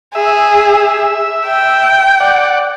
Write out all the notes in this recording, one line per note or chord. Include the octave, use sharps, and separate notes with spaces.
G#4 E5
G5
D5 F#5